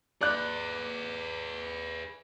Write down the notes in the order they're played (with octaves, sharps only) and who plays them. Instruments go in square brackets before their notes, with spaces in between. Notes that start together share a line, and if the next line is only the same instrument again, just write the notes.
[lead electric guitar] G#4 B4 [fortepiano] D5 F#6